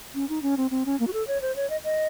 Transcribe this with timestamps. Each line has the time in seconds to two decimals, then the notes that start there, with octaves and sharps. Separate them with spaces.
0.15 C#4
0.29 D#4
0.42 C#4
0.57 C4
0.71 C4
0.86 C#4
1.00 A#3
1.07 F#4
1.13 A4
1.27 C#5
1.42 C5
1.56 C#5
1.70 D#5
1.84 D#5